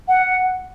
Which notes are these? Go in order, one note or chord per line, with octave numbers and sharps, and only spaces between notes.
F#5